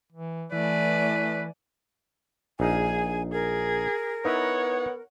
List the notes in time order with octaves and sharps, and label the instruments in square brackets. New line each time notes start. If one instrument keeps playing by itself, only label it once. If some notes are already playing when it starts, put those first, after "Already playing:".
[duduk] E3
[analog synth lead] E3 [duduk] A3 [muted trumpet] B4 [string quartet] D5 G#5
[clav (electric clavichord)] A#1 D#4 F5 [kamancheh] G#4 [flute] G#5
[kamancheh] G#4 [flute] A#4
[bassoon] B3 [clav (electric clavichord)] D#4 E4 B4 [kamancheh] C#5 F#5